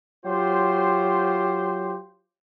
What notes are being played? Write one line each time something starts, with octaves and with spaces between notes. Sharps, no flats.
F#3 F4 G4 C5